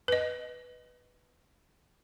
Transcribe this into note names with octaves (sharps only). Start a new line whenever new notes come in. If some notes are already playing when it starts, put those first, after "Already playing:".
B4 D#5